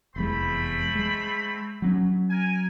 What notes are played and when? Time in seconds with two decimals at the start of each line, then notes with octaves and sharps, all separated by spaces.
0.16 F1 E2 G#3 A3 C4 B5
0.95 G#3
1.82 F#3 C4 C#4
2.30 A#4 G#5